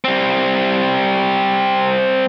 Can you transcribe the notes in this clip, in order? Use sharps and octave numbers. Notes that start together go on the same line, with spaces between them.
G3 C4